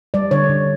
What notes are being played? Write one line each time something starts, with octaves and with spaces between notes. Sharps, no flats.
G3 D5
D3 C#5
D3